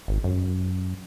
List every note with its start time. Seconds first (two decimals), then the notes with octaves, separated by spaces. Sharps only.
0.08 G#1
0.24 F#2